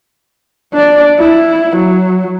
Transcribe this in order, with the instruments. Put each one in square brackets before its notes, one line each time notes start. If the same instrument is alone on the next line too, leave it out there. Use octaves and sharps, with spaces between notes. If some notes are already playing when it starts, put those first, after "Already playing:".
[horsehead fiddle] D4 D5
E4
F#3